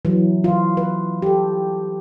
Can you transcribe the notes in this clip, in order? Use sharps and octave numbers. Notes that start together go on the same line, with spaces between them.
E3 F#3
E3 F4
B4
G4 A4